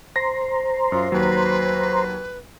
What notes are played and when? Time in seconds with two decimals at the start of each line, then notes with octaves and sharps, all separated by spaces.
0.16 C5 A#5 C6 A#6
0.92 F#2 F4
1.12 D#2 F#3 B4